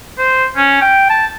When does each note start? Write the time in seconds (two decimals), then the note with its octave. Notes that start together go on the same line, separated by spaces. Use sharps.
0.18 C5
0.56 C#4
0.81 G5
1.10 A5